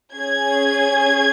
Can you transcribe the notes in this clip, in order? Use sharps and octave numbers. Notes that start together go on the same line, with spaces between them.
C#4 G#4 G#6